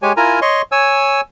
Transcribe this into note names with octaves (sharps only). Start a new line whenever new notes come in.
G#3 G4 C#5 G#5
E4 F4 A#4 G#5 A#5
C#5 D#5 C6 C#6
C#5 G#5 E6